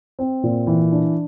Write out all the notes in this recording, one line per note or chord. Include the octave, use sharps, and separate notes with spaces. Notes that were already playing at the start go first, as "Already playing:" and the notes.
C4
A#2
E3
D4